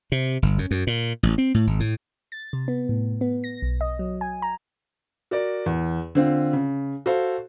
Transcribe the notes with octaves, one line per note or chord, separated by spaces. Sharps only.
C3
G1
F#2
F#2
A#2
A1
C4
A2
G#1
A2
A6
C3
B3
A2
B3
A#6
B1
D#5
F#3
G#5
A#5
F#4 A#4 D5
E2
D3 C4 F4
C#3
F#4 A4 C5 F5